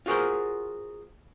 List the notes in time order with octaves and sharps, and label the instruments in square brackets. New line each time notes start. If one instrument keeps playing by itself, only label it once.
[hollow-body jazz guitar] F4 F#4 G#4 A#4 C5